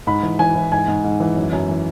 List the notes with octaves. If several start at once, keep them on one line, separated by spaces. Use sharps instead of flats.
G#2 B5
E3
E3 G#5
E3
G#2 G#5
G#2
G#2
E3
F#2
F#2
E3